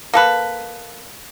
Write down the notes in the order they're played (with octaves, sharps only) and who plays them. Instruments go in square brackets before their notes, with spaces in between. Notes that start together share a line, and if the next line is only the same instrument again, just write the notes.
[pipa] A#3 A4 B4